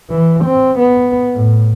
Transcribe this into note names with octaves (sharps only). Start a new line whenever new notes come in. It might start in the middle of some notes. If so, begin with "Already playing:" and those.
E3
C4
B3
A2